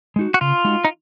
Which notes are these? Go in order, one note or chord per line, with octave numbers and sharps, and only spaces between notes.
G#3 D#4 F#4
F#4
C#3 F4
G#3 D#4 F#4
D#4